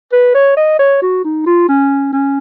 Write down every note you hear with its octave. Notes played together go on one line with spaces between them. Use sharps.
B4
C#5
D#5
C#5
F#4
D#4
F4
C#4
C#4